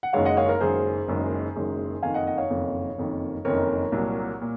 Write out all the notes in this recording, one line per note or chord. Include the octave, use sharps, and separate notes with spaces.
F#5
F#1 F#2 D#3 G#3 C#5 F5
D#5 F#5
C#5 F5
A#4
F#1 F#2 D#3 G#3 G#4 C5
F#1 F#2 D#3 G#3
F#1 F#2 D#3 G#3
F#1 F2 D#3 F5 G#5
D#5 F#5
D#5 F#5
C#5 F5
F#1 F2 D#3
F#1 F2 D#3
F#1 F2 D#3 A#4 C#5
C2 A#2 F#3
A#2